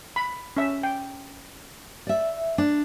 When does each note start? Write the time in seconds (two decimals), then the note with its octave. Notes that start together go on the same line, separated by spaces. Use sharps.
0.16 B5
0.57 C#4 E5
0.83 G5
2.07 D5 E5
2.58 D4